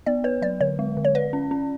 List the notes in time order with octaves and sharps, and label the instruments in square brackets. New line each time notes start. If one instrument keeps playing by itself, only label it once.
[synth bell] B3 [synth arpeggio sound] D5
[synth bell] B4 [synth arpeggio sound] C#5
[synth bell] F#3 [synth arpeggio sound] D5
[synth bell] D3 [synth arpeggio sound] C#5
[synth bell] G#3
D3
[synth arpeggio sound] C#5
[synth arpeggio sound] B4 [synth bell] D5
[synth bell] C#4
C#4